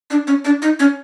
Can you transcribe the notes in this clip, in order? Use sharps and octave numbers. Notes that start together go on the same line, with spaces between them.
D4
C#4
D4
D#4
C#4